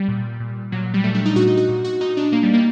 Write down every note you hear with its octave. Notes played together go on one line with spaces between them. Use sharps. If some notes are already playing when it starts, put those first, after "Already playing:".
Already playing: G3
A#2
A#2
A#2 F#3
G3
A#2 A3
D4
D#4
A#2 F#4
D#4
F#4
A#2
F#4
A#2 D#4
D4
A#2 A#3
G3
A#3